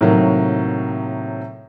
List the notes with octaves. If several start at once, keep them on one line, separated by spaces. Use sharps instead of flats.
A2 C3 D#3 F#3 A#3